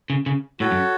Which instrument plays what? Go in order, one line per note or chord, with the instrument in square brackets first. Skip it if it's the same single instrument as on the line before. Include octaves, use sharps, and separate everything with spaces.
[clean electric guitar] C#3
C#3
[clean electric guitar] A2 [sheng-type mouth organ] F#4 A4 C#5
[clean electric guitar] F#2